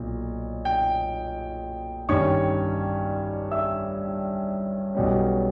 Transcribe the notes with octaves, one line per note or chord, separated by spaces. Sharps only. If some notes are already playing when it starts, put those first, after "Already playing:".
Already playing: B1 A#2
G5
G1 G2 D#3 G3 C#4 C#5 C#6
E5 E6
B1 B2 G3 C#4